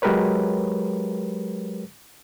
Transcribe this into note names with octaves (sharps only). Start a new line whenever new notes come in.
F#3 G#3 G4 A#4 B4 C#5